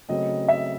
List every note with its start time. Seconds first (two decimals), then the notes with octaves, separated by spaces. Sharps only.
0.09 C#3 F#3 A3 C4 D#5
0.48 E5